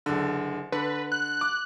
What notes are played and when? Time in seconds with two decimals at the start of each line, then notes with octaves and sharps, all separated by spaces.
0.06 F#1 D3
0.72 D3 B4
1.12 F#6
1.25 F#6
1.41 D6